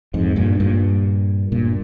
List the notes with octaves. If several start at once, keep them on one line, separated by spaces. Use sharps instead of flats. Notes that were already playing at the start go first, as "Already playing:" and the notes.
F2 G#2
G2 A#2
G2 A#2
G2 A#2